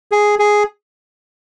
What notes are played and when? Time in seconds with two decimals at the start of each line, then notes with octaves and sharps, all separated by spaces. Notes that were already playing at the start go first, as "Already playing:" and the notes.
0.12 G#4
0.39 G#4